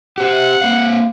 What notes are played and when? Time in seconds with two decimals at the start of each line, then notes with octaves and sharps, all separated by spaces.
0.18 G4 C5 F#5
0.62 A#3 C4 F5